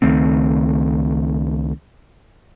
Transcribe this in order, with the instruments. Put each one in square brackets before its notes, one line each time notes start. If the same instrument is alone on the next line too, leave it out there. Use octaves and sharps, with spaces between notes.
[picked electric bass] C#2 D#3 A3 C4